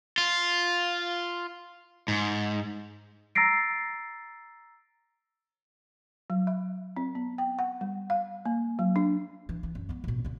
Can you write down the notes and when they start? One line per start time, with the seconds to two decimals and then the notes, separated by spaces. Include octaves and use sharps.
0.18 F4
2.08 G#2
3.35 A#5 E6 A6 A#6 C7 D7
6.30 F#3
6.47 E5
6.97 C4
7.15 B3
7.38 G5
7.59 F#5
7.81 G3
8.10 F5
8.46 A#3
8.79 F#3
8.96 D4
9.49 E3
9.63 E3
9.75 F#2
9.89 G#3 B3
10.04 A1 B2
10.24 C#3 G#3